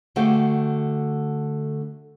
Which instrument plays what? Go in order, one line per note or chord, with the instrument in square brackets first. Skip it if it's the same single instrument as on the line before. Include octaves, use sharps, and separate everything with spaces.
[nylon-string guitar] D3 A3 F#4 G4 C5 F5